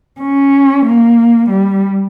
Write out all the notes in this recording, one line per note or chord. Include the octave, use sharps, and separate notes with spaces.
C#4
A#3
G3